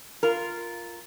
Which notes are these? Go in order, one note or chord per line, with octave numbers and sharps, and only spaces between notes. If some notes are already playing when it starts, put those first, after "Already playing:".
F4 A#4